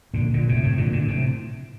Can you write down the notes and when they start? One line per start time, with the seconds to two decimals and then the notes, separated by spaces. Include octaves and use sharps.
0.14 A#2 D3
0.34 A#2 D3
0.49 A2 C3
0.63 A2 C3
0.78 A#2 D3
0.93 A#2 D3
1.08 A2 C3